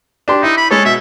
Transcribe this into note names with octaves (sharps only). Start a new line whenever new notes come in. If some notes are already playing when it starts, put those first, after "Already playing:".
D4 G4 C6
D#4 E4
B5
G#3 A4 C#5
B2 E5